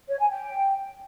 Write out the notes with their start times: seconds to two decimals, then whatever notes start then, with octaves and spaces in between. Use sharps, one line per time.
0.09 C#5
0.19 G#5
0.30 G5